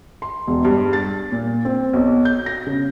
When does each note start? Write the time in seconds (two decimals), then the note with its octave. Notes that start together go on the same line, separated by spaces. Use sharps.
0.22 C6
0.47 E1
0.65 G2
0.93 A6
1.32 A#2
1.65 C4
1.93 B1
2.25 G6
2.46 A#6
2.67 C#3